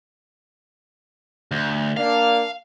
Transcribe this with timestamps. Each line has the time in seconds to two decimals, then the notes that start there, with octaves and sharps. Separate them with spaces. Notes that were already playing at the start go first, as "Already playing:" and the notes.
1.51 D2
1.97 A#3 D4 F5